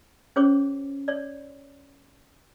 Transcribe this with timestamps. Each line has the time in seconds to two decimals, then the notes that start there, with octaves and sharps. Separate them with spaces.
0.36 C#4 G#4 C5 C#5 D6
1.08 C#5 D5